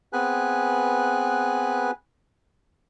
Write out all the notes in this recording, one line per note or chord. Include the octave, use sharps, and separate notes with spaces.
B3 C4 G#4 B4 G#5 F#6